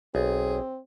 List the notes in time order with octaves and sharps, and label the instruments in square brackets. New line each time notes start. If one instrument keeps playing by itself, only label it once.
[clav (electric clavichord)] B1 [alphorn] C4 [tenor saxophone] G#4